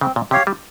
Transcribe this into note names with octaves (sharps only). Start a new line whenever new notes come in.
C#3 C4
A#2
C3 G4 C#5 F5
G3